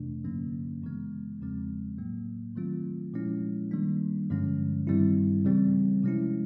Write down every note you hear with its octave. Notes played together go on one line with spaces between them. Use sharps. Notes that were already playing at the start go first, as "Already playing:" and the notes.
Already playing: F2 C3 E3 A3 D4
G2 D3 F#3 A#3 C#4
F#2 C#3 E3 G#3 B3
E2 C#3 F3 G#3 C4
A2 F#3 A#3
D#3 F#3 A3 C4 F4
A#2 F3 G#3 C#4 E4
D#3 G3 A#3 D4
G2 D3 F3 G#3 C#4
G2 D#3 G3 C4 E4
C#3 E3 G3 C4
C3 F3 G#3 C#4 E4